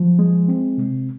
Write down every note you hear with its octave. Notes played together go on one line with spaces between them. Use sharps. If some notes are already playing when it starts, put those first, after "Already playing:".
Already playing: F3
G#3
C4
C3